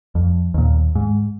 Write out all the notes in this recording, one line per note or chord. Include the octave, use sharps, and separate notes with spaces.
F2
D#2 A#2
G#2